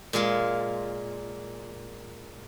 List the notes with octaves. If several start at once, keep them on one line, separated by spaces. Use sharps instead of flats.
A#2 G#3 F4